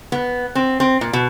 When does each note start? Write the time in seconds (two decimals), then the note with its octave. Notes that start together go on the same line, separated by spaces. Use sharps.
0.12 B3
0.55 C4
0.80 C4
1.01 A#2
1.13 B2